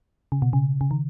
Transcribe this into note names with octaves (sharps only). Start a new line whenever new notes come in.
C#3
B2
C#3
C#3
D#3